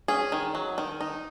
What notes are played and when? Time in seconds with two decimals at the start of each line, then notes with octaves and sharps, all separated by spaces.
0.08 C#4 G#4
0.32 D#3
0.55 F#3
0.78 D#3
1.01 D#4